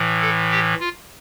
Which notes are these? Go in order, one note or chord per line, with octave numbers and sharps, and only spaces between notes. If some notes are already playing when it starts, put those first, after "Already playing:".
Already playing: A2 E3
A4
G4
F4